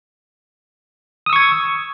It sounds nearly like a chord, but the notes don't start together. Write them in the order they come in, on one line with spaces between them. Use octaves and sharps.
D#6 E6 C#6 G#6